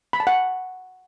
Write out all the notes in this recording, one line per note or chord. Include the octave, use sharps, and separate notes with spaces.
B5
A5
F#5